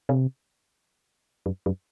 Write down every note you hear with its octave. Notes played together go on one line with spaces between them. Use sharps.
C3
F#2
F#2